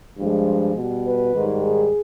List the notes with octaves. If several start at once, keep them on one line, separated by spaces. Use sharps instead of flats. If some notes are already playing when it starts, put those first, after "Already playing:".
G2 F3 G#3
B2 G3
B4
G#2 D#3 G3
G#4